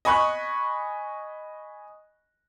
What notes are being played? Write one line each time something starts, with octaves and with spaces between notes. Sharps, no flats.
D#5 G#5 B5 C#6 F#6